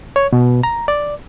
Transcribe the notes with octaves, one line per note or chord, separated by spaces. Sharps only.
C#5
B2
A#5
D5